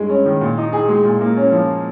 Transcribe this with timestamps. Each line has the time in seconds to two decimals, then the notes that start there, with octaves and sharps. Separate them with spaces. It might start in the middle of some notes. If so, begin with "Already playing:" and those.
Already playing: G2 G#3
0.09 C#4
0.25 D#3
0.41 A#2
0.58 D#4
0.73 G#4
0.89 G#3
1.05 A#2
1.21 A#3
1.37 C#4
1.52 F3